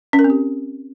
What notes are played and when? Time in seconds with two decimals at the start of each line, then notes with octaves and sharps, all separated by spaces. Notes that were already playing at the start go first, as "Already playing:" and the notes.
0.13 C#4
0.19 A#4
0.24 C4
0.30 G4